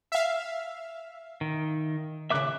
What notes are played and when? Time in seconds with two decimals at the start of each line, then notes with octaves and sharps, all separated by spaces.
0.12 E5 F5
1.41 D#3
2.30 A#2 C#3 E5 D6 F#6